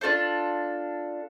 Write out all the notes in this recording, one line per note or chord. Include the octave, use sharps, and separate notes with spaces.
D4 F4 A4 C5